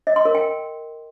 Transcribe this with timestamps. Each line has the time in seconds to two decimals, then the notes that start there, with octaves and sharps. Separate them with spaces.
0.07 D#5
0.16 C6
0.25 A#4
0.35 G5